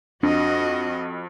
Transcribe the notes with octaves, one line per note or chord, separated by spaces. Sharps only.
F2 D4 F#4 D#5